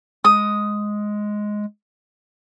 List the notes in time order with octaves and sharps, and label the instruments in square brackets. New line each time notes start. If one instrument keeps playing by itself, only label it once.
[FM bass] G#3 [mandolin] D#6